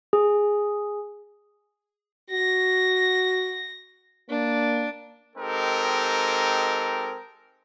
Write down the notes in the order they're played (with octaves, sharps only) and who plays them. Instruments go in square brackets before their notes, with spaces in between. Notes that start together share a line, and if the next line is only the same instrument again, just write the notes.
[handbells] G#4
[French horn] F#4 [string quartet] A#6
[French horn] A#3 [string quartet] D4
[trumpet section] G#3 C4 D#4 G4 A4 A#4